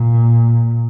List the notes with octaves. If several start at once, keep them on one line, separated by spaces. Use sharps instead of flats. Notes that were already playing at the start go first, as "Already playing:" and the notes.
Already playing: A#2